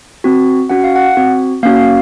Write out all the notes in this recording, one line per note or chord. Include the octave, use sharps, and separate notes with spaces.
C4 F#4
C#4 F#4 F#5
F5
F#5
C4 F#4
A#3 C#4 F#4 F5